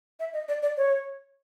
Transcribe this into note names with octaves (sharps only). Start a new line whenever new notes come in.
E5
D#5
D5
D5
C#5